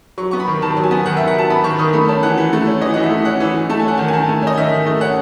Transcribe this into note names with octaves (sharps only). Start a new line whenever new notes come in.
F#3 C#6
B3 C#6
B5
D#3
D#3 A5
F#3
G#5
B3
D#3 F#5
D#3 E5
F#5
F#3 A5
B3 B5
D#3 C#6
D#3 D#6
A3 B5
C#4 A5
E3 F#5
E3
A3
C#4
E3 D#5
E3 F#5
E5
A3
C#4 F#5
E3
E3
A3 A5
G#5
C#4 F#5
D#3 G#5
G#5
D#3 A5
A3
C#4 D#5
D#3 E5
D#3
A3
C#4 F#5